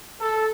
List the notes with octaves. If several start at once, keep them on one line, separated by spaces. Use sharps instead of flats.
A4